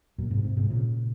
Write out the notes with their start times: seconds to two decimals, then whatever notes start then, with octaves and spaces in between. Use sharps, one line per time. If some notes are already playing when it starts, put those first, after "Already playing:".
0.18 F#2 A#2
0.31 G#2 C3
0.44 G#2 C3
0.57 G#2 C3
0.70 A#2 C#3